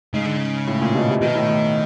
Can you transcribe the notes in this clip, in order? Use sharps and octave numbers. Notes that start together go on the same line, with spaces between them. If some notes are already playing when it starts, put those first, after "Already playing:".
G#2 C#3
D3
C#3
A2
A#2
B2
C3
B2 D#3
A2
A2